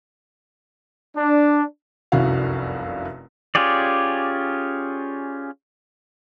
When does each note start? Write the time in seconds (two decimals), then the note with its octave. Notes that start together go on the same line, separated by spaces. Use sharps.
1.16 D4
2.12 F1 C2 F#2 E4 F#4 F5
3.55 C#4 F4 G4 G#4 D5